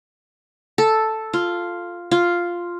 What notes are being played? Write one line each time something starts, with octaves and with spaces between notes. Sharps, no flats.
A4
F4
F4